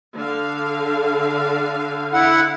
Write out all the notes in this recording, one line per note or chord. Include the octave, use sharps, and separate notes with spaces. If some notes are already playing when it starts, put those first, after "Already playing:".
D3 F5
E4 F#5